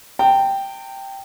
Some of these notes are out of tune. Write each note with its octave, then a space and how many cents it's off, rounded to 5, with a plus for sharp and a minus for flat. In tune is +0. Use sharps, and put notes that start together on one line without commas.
G5 +0 A#5 -45